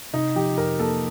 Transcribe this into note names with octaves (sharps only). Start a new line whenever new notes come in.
C3 D#4
F3 G4
F2 A#4
A#3 A4